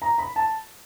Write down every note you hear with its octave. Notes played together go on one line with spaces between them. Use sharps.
A#5
B5
A5